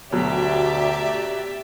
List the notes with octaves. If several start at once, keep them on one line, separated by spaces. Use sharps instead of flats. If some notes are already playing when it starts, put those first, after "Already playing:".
D2 B2 F#3 G4 D5 E5